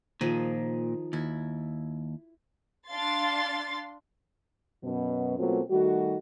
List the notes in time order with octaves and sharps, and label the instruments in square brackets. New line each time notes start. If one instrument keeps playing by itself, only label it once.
[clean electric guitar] A#2 [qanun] D#3 F3 G#4
[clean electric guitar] D#2 [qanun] E4
[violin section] D4 F5 C6 A6
[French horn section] F#2 B2 B3
B2 F#3 A3 A#3 C4 F4
D#3 G3 A3 D#4 F#4